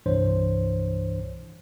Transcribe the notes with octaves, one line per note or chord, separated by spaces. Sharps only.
C2 G2 E3 D4 C5 C#5